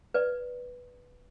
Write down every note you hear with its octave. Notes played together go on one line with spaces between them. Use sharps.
B4 D5